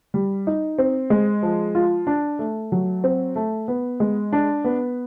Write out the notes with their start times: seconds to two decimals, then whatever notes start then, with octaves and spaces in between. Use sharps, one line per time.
0.14 G3
0.47 D#4
0.78 C4
1.10 G#3
1.43 F3
1.75 F4
2.07 D4
2.39 A3
2.72 F#3
3.04 C4
3.36 A3
3.68 B3
4.00 G#3
4.33 D4
4.64 B3